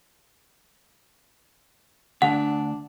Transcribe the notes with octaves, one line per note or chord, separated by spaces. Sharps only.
D2 D4 F#5